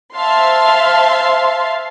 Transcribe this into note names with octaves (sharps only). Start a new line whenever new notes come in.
C5 E5 F5 A5 C6